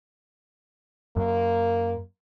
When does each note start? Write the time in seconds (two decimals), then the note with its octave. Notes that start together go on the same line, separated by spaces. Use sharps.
1.17 F#2 A#3